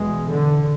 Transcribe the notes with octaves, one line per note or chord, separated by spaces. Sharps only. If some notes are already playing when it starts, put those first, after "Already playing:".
Already playing: E2 B2 G#3
D3